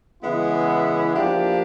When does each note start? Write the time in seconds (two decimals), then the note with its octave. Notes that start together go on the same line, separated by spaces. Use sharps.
0.23 C#3 E3 G#3 B3 E4
1.16 F3 A#3 D4 G4